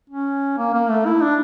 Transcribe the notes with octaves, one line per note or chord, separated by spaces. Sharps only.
C#4
A#3
A#3
A3
E4
D4